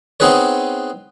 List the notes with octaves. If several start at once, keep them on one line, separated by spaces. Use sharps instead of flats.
B3 C4 D#4 G#4 B4 C#5